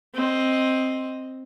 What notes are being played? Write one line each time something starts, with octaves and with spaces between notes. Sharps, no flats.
C4 D#5